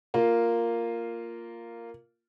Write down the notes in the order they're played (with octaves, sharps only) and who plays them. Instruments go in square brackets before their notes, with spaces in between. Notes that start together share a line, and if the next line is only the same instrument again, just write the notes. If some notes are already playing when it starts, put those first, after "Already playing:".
[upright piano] A#3 F4